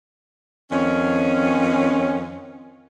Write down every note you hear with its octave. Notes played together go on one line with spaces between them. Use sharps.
F2 D#3 C#4